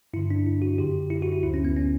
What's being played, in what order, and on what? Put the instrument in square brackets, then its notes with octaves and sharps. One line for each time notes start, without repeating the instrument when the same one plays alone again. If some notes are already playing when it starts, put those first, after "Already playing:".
[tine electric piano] G2 D3 E4
D4
E4
F#4
F#2 D3 G4
E4
F#4
E4
D2 D3 E4
C#4
B3
C#4